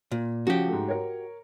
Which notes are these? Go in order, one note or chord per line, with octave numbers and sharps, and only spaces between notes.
A#2
C#3 F3 C#4 F#4 G4
G#2 A3
A#4 C#5